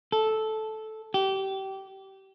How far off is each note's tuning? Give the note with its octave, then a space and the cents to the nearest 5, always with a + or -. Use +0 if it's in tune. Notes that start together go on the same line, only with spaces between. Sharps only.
A4 -10
G4 -25